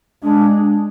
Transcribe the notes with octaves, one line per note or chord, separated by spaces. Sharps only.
G#3 D4